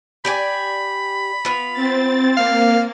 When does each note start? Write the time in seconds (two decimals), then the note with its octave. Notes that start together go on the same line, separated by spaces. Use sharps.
0.25 G4 D5 G#5 B5
1.45 B3 F4
1.73 C4 A6
2.37 A#3 F5